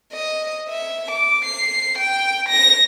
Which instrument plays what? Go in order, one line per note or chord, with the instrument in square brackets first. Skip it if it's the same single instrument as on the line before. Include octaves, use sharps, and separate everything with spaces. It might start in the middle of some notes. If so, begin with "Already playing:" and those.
[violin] D#5
E5
D6
C7
G5
A#6